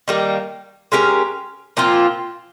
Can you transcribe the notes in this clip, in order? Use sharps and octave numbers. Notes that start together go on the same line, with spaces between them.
D#3 G3 A#3
G#3 C#4 G4 A#4
A#2 F3 C4 F4